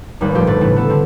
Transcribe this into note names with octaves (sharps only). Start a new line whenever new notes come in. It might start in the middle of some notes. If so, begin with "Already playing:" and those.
G#1 D#2 G3 B4
A#2 F3 A3 C4 G4
G1 G2 A3 C4 B4 A6
A2 C#3 E3 A3 E4
B3 A4
D3 C4